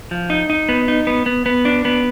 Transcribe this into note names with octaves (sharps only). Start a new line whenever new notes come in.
F3
D#4
D#4
B3
D#4
B3
B3
B3
D4
B3